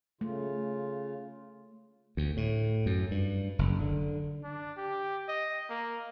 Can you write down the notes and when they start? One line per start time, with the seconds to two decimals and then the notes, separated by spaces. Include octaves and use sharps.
0.21 C#3 A3 F4
2.17 D2
2.37 A2
2.86 F#2
3.11 G2
3.59 F#1
3.80 D3
4.44 D4
4.77 G4
5.29 D#5
5.70 A#3